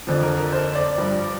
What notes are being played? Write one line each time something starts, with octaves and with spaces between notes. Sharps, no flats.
F2 D3 F3
A#4
A#4
C5
D5
G2 F3